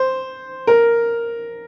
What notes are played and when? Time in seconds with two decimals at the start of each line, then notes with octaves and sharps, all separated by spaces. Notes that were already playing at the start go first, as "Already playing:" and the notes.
Already playing: C5
0.67 A#4